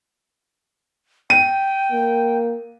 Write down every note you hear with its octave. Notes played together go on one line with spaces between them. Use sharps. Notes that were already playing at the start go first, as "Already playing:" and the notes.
G5 D#7
A#3